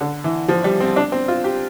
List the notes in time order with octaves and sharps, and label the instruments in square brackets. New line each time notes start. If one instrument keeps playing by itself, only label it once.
[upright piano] D3
E3
F3
G3
C4
D4
C4
F4
G4